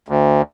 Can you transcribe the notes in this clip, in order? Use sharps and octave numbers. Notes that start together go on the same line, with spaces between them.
D2